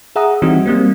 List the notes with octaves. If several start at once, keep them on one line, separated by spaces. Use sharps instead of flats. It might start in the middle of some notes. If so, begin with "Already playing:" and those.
G#4 E5 F#5 A#5 D#6
E3 G3 C4 D#4 F#4
G3 A#3 C4